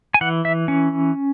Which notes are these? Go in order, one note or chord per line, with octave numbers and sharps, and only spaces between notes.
G#5
E3 F#5
E5
C#4